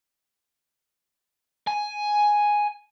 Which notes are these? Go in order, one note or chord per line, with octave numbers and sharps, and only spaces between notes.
G#5